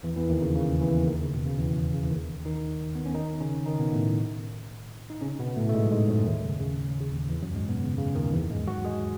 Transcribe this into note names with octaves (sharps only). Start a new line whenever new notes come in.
E2 E3
E2 E3
D#2 D#3
C#3
C#3
E2 E3
D#2 D#3
C#3
B2
C#3
E2 E3
C#3
E3
D#2 D#3
D#3 D#4
B3
C#4
D#3 D#4
C#3 C#4
D#3 D#4
B2 B3
A2 A3
D#4
C#3 C#4
B2 B3
A2 A3
A3
G#2 G#3
F#3
G#2 G#3
F#2 F#3
D#2 D#3
C#3
C#3
C#3
D#2 D#3
E2 E3
F#2 F#3
G#2 G#3
B2 B3
C#3
C#3
D#2 D#3
E2 E3
G#2 G#3
F#3 F#4
G#3 G#4